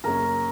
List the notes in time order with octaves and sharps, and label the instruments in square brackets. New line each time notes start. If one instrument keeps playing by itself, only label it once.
[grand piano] F#2 C#3 F#3 A#3 C#4 [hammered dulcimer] A#4